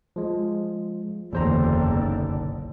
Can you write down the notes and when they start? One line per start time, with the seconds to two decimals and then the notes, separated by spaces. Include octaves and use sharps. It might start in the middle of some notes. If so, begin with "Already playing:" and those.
0.16 F3 G#3
1.33 F#1 E2 D3 C5 A#5
1.88 B1